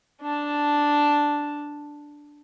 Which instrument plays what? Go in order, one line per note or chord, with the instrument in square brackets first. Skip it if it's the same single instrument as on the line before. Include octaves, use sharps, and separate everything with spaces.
[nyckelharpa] D4 A5